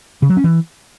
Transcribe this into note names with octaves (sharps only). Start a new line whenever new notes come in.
C#3
F#3
C#4
E3